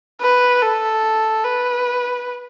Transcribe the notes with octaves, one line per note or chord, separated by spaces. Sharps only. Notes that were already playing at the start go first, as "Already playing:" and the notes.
B4
A4
B4